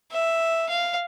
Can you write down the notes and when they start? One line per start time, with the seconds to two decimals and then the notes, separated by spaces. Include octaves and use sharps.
0.11 E5
0.69 F5